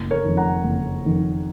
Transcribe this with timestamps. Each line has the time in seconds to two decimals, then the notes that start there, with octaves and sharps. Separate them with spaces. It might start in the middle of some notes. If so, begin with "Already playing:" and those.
Already playing: F#1
0.11 A#4 C#5
0.24 F2 D#3
0.37 F#5 A#5
0.64 F#1
1.05 F2 D#3